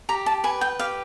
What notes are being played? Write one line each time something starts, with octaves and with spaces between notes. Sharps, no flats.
G4 A#5
A5
B4 G#5
G5
G4 F5